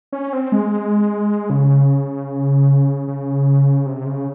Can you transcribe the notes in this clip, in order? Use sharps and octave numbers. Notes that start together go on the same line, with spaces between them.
C#4
C4
G#3
C#3
C#3
C3
C#3